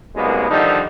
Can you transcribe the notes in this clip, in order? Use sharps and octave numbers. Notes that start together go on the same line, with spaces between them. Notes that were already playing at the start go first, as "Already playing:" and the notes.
C2 F#2 G#3 A#3 B3
D3 D#3 F3 G3 D#4